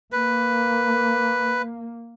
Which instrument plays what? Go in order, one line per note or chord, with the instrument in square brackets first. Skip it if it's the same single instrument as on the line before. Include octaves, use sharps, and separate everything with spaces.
[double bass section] A#3 [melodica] B4